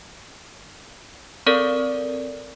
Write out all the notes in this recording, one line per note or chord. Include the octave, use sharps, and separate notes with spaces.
C4 A4 A#4 D5